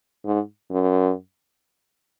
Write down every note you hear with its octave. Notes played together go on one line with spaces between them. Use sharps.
G#2
F#2